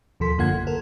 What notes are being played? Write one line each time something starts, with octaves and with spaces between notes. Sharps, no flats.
D#2 B2 F3 A4 C6 B6
F#2 D3 A#3 F4 F#5 G#6
A1
A4 A#4